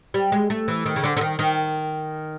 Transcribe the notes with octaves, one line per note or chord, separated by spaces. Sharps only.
G3
G#3
A3
E3
D#3
C#3
D3
D3
D#3
D#3